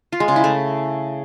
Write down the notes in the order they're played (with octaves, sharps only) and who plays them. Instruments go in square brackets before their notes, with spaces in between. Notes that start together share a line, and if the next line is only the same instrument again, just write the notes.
[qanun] F4
G#3
C#3
E4
A3